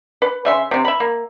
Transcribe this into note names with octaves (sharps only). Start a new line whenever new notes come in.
B4
C#3 E5 C6
C3 C4
E5 B5
A#3